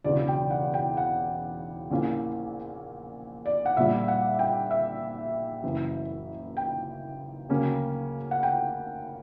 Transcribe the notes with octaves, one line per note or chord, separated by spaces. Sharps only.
E1 E2 C#3 F#3 D5
G5
F#5
G5
F#5
A#1 A#2 A#3 C#4 E4
D5
F#5
A#1 A#2 G3 E5
F#5
G5
E5
F#1 F#2 E3
G5
D2 C#3 F#3 A#3 C#4
F#5
G5